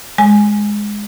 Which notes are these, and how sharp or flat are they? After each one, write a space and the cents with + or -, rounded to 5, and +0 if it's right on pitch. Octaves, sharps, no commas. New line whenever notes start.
G#3 +0 G#5 +0